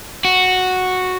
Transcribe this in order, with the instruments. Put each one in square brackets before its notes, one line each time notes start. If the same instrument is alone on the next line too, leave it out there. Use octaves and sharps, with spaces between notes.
[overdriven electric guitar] F#4